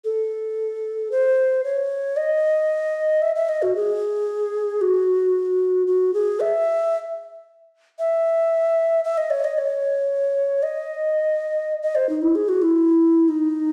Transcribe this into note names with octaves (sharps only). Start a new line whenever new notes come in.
A4
C5
C#5
D#5
E5
E5
D#5
F#4
G#4
F#4
F#4
G#4
E5
E5
E5
D#5
C#5
D#5
C#5
D#5
D#5
C5
D#4
E4
G#4
F#4
E4
D#4